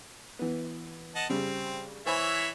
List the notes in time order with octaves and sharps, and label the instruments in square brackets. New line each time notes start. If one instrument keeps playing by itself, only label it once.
[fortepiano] E3 B3
[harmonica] D#5 F#5 A5
[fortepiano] C#3 G3 [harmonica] C4
[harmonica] E3 C#5 E5 [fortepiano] C5 G#5 B5